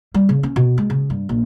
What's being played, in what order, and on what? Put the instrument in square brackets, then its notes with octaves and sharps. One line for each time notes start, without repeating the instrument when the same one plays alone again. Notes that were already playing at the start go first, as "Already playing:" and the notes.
[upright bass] G3
C#3
C#4
B2
G#3
C#3
G2
A#1